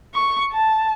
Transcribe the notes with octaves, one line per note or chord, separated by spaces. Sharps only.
C#6
A5